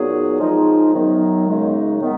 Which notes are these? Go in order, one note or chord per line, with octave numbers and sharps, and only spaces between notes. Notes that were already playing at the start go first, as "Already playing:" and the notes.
Already playing: A#2 F#3 B3 D#4 G#4
F3 G#3 D#4
F#2 D#3 F#3 B3 D#4
F#2 C#3 G#3 B3 D#4
D#3 G#3 B3